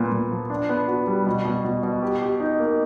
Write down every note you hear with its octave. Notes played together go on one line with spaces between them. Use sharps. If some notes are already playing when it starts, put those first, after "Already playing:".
Already playing: A#2 B3
A#2
F3
D4
B3
F#4
G3
B2
B2
B2
B2
G4
G4
D#4
A#3